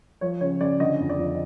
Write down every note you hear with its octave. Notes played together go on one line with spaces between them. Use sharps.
F3 C#5
C#3 C#5
C#3 D5
D3 D#5
F2
D5
F2